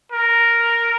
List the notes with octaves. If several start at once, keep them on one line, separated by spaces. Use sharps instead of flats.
A#4